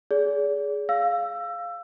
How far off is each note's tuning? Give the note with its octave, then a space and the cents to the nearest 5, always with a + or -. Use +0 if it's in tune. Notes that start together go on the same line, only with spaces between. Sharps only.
G#4 +5 D5 -40
F5 +0 E6 +20